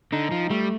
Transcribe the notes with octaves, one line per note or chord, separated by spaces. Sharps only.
D3 D#4
F3
G3 A3